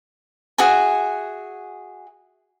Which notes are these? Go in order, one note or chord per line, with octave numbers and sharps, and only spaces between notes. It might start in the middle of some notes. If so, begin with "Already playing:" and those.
F#4 G#4 E5 G#5